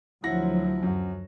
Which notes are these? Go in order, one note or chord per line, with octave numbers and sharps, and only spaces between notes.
D2 F3 F#3 E4 F#5 A#6
F#2 F#4